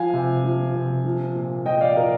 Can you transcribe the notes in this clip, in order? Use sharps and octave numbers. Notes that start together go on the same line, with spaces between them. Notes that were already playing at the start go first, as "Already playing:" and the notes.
Already playing: F3 F5 G#5
C3
F3
C3
F3
A#2
F3 D#5 G5
D5 F5
A#2 A#4 D5